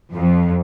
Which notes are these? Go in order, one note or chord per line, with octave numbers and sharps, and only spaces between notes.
F2